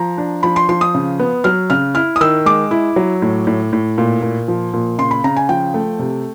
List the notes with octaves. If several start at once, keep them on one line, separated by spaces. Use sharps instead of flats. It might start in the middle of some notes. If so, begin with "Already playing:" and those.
Already playing: F3 A#5
D4
F3 B5
C6
F3 C6
D#6
C#3
B3
F#3 F6
C#3 F6
E4 F6
D#6
D#3 E6
G#3 D6
E4
F#3
A2
A2
A2
A#2
A#2
F3
A#2
C#3 C6
B5
C#3 A#5
G#5
F3 G5
A3
C3